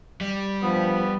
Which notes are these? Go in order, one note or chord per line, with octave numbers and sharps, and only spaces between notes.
G3
G2 F3 B3